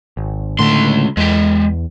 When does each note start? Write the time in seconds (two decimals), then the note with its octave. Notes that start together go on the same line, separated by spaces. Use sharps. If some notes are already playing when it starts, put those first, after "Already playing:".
0.17 G#1
0.59 C#2 A2 D3 A3 C6
1.17 E2 G#3 G4